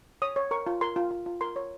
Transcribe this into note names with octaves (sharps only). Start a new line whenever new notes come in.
C#5 D#6
C#5
A#4 C#6
F4
A#4 C6
F4
F4
F4
A#4 C6
C#5